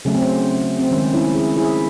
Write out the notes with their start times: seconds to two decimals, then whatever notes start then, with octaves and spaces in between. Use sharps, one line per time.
0.05 C#3 F#3 A3 C#4
0.15 C4
0.23 C#4
0.79 C4
0.91 D#3 G#3 C#4
1.13 C#4 E4
1.35 E4 G#4
1.57 E4 G#4